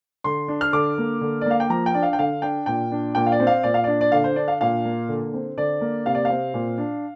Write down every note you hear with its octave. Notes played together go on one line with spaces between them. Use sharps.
D3 C6
D4
F6
D3 D6
A#3
D3
D5
A#3 F5
G5
F3 A#5
G5
D4 D5
F5
G5
D3 F5
D4 G5
A#2 G5
D4
A#2 G5
F5
D5
C4
F5
A#2 D5
F5
D4 D5
D5
D3 F5
C5
D4 D5
F5
A#2 F5
A#3
D3
C4
D3 D5
A#3
C3 F5
D5
F5
C4
A#2
D4